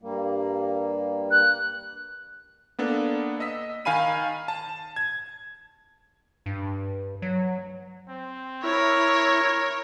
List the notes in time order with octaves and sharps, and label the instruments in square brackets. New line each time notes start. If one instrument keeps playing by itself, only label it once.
[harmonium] G2 G3 A#3
[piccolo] F#6
[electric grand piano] A#3 B3 D4 A4
D#5 E6 B6
D#3 F5 G#5 B5 D#7
A5
G#6
[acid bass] G2
F#3
[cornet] C4
[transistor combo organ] E4 [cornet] A#4 [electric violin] C#5